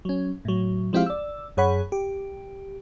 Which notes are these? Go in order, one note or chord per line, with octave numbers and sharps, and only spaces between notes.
F#3 C#4
A2 F#3
F3 G#3 C4 E4 G4 F5
D5 E6
F#2 G#4 C#5 F#5 B5
G4